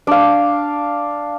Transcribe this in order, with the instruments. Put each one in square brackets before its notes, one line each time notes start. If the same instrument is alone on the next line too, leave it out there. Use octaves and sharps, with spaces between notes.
[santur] D4 F5